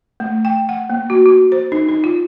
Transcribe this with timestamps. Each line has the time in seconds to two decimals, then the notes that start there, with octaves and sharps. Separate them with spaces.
0.20 A3
0.45 G5
0.69 F#5
0.90 A#3
1.10 F#4
1.26 F#4
1.52 C5
1.72 D#4
1.89 D#4
2.04 F4